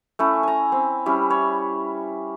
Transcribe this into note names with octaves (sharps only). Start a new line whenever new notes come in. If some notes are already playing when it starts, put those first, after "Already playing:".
A3 C#4 E4
G#5 A#5
C4
G3 C#4 E4
C#5